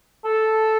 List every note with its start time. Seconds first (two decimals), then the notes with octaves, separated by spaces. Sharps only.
0.25 A4